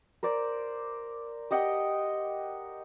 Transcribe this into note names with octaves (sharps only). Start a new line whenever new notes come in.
A#4 C5 D5
G4 D#5 F#5 G5